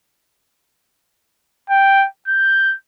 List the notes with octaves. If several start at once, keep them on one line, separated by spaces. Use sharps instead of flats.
G5
G6